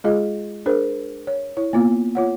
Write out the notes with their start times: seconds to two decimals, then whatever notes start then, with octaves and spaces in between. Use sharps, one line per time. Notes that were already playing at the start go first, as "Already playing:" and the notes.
0.04 G#3 F4 G#4 D#5
0.66 D4 G#4 A#4 C5
1.27 C#5
1.57 E4 C#5
1.73 A#3 B3 F4
2.15 F4 C#5 F#5